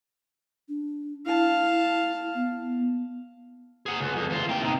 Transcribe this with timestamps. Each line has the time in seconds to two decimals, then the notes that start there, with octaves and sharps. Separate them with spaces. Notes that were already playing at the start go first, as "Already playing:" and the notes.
0.69 D4
1.26 E4 F5 A5
2.35 B3
3.86 G#4 F#5
4.00 C#2
4.16 F2
4.30 E2 F4
4.49 A#3 G5
4.61 C3 D#4